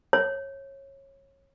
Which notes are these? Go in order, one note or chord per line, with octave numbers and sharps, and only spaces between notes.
C#5